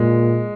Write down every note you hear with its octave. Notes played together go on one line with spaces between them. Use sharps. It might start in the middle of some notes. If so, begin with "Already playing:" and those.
Already playing: A#2 G#3